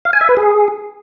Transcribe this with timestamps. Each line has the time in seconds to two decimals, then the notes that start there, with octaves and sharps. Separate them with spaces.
0.05 F5
0.13 G#5
0.21 E5
0.29 B4
0.37 G#4